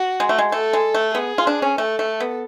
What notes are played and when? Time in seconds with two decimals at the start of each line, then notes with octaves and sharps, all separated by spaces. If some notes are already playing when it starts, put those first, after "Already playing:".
Already playing: F#4
0.20 G#3
0.29 A3
0.38 G#3
0.52 A3 A4
0.73 G#3
0.94 A3
1.15 B3 G#4
1.38 F4
1.47 D4
1.62 C#4
1.78 A3 A4
1.99 A3
2.20 B3